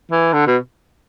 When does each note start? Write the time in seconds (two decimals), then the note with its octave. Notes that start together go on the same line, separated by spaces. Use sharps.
0.11 E3
0.33 D3
0.47 B2